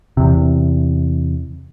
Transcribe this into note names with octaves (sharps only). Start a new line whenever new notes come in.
E2 C3